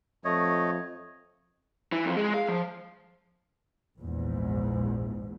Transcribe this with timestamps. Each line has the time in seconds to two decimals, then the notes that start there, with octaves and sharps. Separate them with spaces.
0.25 F2 A3 C#5 D#5
1.92 E3
2.05 F2
2.17 G#3
2.34 F5
2.48 F3
3.99 A#1 E2 G#2